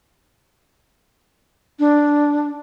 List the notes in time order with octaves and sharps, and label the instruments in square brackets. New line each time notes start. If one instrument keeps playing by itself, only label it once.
[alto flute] D4